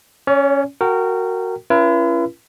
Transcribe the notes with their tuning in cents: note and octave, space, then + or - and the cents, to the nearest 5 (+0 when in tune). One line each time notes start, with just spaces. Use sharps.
C#4 +0 C#5 +45
F#4 +0 A#4 -20 G5 -15
C#4 +0 E4 +45 B4 -40